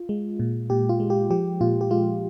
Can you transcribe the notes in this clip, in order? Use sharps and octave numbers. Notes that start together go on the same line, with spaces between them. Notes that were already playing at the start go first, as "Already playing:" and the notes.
Already playing: F4
G#3
A#2
A#2 G4
F4
G#3
G4
F3 G4
A#2 F4
G4
G#3 F4